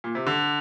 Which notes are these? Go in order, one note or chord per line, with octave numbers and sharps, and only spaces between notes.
A#2
C3
D3